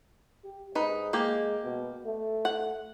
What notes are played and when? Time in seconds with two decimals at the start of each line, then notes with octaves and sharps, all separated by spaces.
0.45 G4
0.75 G#2 D#4 B4
1.13 G#3 A#3 G4
1.64 B2
2.06 A3
2.45 F#5